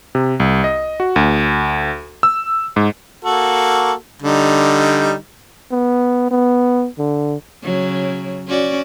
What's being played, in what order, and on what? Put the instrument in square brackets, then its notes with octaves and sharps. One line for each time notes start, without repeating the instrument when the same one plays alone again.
[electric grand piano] C3
C2
D#5
F#4
D2
E6
G#2
[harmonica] A#3 F#4 A4
D3 G3 D#4
[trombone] B3
B3
D3
[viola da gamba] C#3 F#3
C#4 F#4 D5